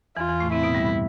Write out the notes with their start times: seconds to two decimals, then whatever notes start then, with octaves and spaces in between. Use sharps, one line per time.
0.17 E2 E3 F4
0.29 E2 E3
0.40 A2 A3
0.52 C3 C4 E4
0.63 B2 B3
0.75 G2 G3